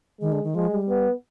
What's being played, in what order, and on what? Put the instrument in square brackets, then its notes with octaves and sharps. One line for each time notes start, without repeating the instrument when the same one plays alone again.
[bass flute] D#3 [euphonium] G#3
[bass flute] D3
D#3
[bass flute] F3 [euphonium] G#3
[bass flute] G3
[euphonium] B3